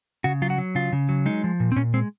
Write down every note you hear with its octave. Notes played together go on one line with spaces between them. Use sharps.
C#3 F#4
F#3 F4
F#4
F#3
C#3 F4
C#3
F#3
G#3 D#4
F3
A#2
C4
A#2 C#4
G#3 C4